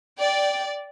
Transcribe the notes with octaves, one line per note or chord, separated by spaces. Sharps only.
D5 G5